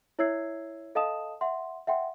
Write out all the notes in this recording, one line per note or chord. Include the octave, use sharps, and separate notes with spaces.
E4 C#5 E5 E6 G#6 C7
A4 D#5 F5 A5 D#6 E7
E5 F#5 C6
E5 F#5 G5 C6